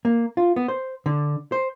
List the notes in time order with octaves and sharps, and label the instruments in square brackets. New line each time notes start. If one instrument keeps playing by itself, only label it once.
[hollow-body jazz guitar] A#3
F4
B3
C5
D3
C5